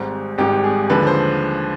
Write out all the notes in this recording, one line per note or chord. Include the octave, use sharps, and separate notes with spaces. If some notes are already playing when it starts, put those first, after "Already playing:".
Already playing: G#1 G#2 G3 C4
G#1 G#2 G3 G4
G#4
D#2 D3 F3 G#3 B4
C5